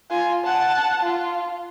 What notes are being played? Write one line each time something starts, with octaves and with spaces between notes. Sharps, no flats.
F4 G#5
F#5 A5
F4